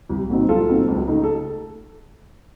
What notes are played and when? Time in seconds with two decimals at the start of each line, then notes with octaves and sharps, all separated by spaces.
0.09 C2
0.29 A#2 F#3 C4 D#4
0.49 C2 F4 A4
0.69 A#2 F#3 C4 D#4
0.88 C#2
1.08 C#3 A3 D#4
1.24 A4